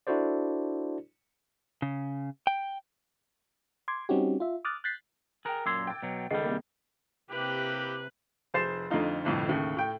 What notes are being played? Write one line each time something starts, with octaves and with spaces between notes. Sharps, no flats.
D4 E4 F#4 A4 C5 D5
C#3
G5
C6 D6 G#6
G3 C4 C#4 D#4 F#4 G4
F4 E5
D6 D#6 F6 F#6 A6
F#6 G6 A6 B6 C7
G#4 A#4 G5 F#6
F#2 A#2 C6 D6 E6 G#6
G5 A6
B2 F#3
C#2 D#3 G3 G#4 A4 D#5 C7
C2 A#3
C3 A#3 E4 G4 B4 F#6
F1 G#4 C5 A6 C7 E7
F2 D3 A3 D#4 F4
G1 C2 F2 A2
D#2 A2 C#3
A2 G5